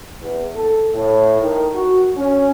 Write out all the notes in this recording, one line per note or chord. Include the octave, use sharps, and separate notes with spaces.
E2
A4
A2
D#3
F#4
C#4